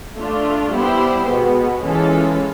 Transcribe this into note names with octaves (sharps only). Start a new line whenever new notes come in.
A3 D4 F4
G3 B3 E4 G4 C5
B2 G#3 B3
E3 G#3 C#4 F4 A4